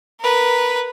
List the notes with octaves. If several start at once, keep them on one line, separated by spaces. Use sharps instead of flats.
A#4 B4